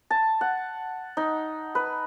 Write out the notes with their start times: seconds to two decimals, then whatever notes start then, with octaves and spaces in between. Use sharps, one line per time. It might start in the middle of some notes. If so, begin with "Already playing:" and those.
0.10 A5
0.41 F#5
1.17 D#4
1.75 B4